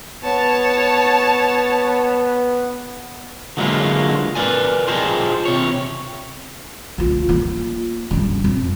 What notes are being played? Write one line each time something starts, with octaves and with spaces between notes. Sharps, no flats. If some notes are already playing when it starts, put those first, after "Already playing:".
B3 C#5 A5
D3 F#3 G#3 A#3 E4 F4
A#4 B4 D5 G#5
F4 G4 G#4 C5 D#5 A5
C3 C#5
D2 F4
A#3 F4
G2 C#3
F2